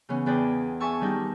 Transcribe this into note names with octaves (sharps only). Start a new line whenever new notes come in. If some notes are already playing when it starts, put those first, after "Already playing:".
C#3 E3 B3 C#4
E2 D4 G#4 B4 D5 G5
G#4 E5 G#5 A5 C#6 E6
D#3 G3 D4 D#4 G4